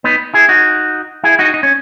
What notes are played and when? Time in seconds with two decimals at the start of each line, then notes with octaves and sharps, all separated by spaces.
0.04 B3 D#4
0.34 E4 G#4
0.49 D#4 F#4
1.24 E4 G#4
1.39 D#4 F#4
1.54 D#4
1.63 C#4